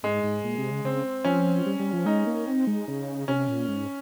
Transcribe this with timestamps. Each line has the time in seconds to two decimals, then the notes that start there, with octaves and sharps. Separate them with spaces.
0.03 G#2 G#3
0.23 G#2
0.44 A#2
0.58 C3
0.71 C#3
0.84 C#3 C4
1.24 F3 C#4
1.66 G3
1.79 G3
1.93 F3
2.06 G#3 D#4
2.27 A#3
2.47 C4
2.67 G#3
2.88 C#3
3.28 C3 C#4
3.48 A#2
3.68 G#2